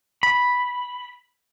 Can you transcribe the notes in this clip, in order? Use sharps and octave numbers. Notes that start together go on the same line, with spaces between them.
B5